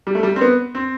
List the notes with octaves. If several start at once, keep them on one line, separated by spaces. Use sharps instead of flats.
G3
A3
G3
C4
B3
C4